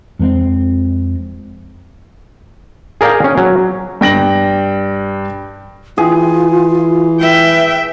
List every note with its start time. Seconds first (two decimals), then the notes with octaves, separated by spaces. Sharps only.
0.19 F2 G#3 A3 C4
3.01 G#4 A#4 D5 F5 G5
3.24 C#4
3.37 F#3
4.01 G2 G5 A#6 F#7
5.98 E3 F4 G#4
7.21 B4 E5 G5